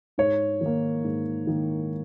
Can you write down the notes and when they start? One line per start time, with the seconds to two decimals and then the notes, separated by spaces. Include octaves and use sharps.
0.18 G#2 C#5
0.61 D#3 A#3
1.04 G#2
1.47 D#3 A#3